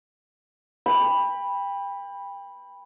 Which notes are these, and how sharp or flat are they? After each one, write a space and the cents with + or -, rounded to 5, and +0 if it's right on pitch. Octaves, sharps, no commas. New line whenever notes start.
G5 +30 B5 -5